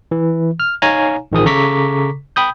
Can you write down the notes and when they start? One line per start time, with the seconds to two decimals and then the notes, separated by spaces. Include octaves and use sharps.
0.11 E3
0.60 F6
0.82 D#4 C#5 F5 G#5 A#5
1.32 A1 D#3 F3 G#4 D#6
1.45 C#3 A4 A#5 C#6 D6 B6
2.36 G5 B5 D#6 G6